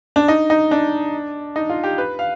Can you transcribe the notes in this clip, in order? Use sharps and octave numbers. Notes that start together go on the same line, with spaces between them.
D4
D#4
D#4
D4
D#4
F4
G4
B4
F5